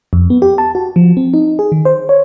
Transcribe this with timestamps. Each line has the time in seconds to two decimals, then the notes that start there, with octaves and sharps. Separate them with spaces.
0.13 F2
0.30 B3
0.42 G4
0.58 A5
0.75 F#4
0.96 F3
1.17 C4
1.34 D#4
1.59 G#4
1.72 D#3
1.85 C5
2.09 C#5